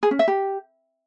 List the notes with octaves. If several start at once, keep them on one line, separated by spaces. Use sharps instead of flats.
G#4
C#4
E5
G4